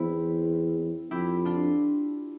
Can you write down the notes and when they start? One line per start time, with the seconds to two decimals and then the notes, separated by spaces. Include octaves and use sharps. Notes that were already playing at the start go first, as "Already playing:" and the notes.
Already playing: E2 C4 E4
1.11 F2 E4 G4
1.45 D4 F4